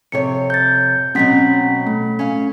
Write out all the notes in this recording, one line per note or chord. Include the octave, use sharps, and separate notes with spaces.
F2 C3 C#5 C#7
G6 A6
B2 F#3 C4 C#4 F#5 B6
A3
C#4 F5